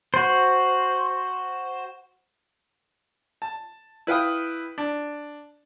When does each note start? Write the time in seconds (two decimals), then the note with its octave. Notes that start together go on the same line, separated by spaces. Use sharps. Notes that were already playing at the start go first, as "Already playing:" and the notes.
0.14 F#4 C5
3.42 A5
4.07 E4 B4 F5 G5 D#6
4.78 D4